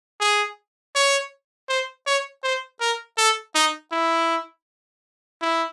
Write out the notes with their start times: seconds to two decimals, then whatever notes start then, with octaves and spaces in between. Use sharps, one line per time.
0.20 G#4
0.95 C#5
1.69 C5
2.07 C#5
2.44 C5
2.81 A#4
3.18 A4
3.55 D#4
3.92 E4
5.42 E4